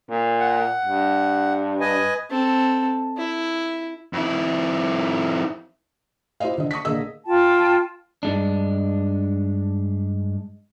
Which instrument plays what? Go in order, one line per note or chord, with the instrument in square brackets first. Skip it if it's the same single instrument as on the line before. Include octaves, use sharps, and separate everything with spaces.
[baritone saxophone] A#2
[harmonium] F#5
[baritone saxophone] G2
[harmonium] B4 D#5 G#5
[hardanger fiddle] C4 A4
E4
[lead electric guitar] F2 E4
[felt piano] E4 F4 G4 C5 D#5 F5
D3 D#5
C#6 D#6 A#6 B6
A#1 D3 A#3 G#4 D#5 E6
[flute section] F4 G5 A5
[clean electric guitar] G2 G#3 D4